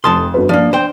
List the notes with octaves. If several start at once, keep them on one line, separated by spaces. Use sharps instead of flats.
F1 F2 A5 C6 D#6
G1 F#4 B4
F3 A#3 D4 D5
C5 G5